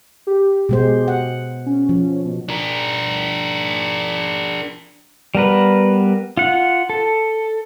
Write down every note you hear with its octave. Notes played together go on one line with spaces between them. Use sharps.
G4
B2 G#3 C5
F#5
C#4
F3
B2
D4 A#4
G3 B3 A#4 B4
F4 F#5
A4